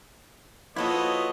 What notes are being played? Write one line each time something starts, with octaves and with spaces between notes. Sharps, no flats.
F3 A#3 B3 E4 F#4 A4 C#5 D#5